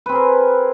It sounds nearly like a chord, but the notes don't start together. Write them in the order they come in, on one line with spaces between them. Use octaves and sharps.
B4 C4 G#4 A#4